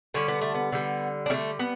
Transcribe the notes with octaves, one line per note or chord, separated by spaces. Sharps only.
D3 G3 C#4
B3
A3
B3
D3 G3
D4
D3 G3 A3 C#4
B3